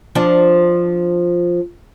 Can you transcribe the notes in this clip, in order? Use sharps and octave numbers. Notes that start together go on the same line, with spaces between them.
F3 D4